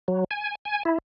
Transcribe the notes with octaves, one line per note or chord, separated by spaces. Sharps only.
F#3
G#5
G#5
E4